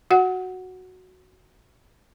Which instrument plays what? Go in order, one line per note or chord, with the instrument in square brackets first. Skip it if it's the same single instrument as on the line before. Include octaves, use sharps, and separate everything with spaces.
[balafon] F#4 F#5